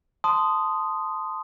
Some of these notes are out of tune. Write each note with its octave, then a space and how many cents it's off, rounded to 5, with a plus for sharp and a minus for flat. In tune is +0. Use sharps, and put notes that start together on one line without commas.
A5 +0 C6 -15 D#6 -5